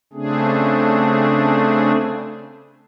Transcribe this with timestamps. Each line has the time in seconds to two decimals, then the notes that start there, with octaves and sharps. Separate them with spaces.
0.13 C#3 A3 C4 D4 G#4